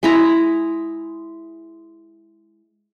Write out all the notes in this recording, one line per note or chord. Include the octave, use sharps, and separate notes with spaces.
G#3 E4 A#5